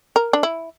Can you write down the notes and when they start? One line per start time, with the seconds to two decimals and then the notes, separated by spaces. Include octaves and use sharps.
0.16 A#4
0.33 D4
0.43 E4